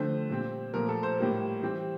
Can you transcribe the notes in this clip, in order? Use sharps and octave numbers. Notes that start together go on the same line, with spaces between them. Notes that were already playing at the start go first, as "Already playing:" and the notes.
Already playing: D3 F3 A3 C4 C5
A#2 G3 C4
A#2 F3 A3 A#4
A4
C5
A2 G3 A#3
E3 G3 C4